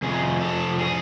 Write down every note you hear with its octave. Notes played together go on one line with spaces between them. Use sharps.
F2 C3 G#4
A4
G#4